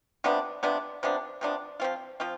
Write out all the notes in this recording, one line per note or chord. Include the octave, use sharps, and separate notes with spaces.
C3 F3 B3 D4
C3 F3 B3 D4
C3 F3 B3 D4
C3 F3 B3 D4
F3 C4 F4
F3 C4 F4